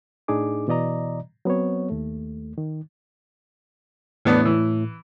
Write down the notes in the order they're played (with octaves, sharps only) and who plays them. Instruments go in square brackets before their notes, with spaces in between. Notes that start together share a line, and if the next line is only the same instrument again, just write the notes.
[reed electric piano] A2 D4 D#4 G#4 D6
B2 E3 D5 D#5 A#5
F#3 B3 C4 C#5
D#2 A3
D#3
[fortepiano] E2 B3 D4 [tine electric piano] A2
[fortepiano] E3